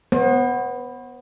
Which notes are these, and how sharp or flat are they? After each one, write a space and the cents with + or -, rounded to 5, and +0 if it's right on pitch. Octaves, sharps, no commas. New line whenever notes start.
B3 +0 C5 +40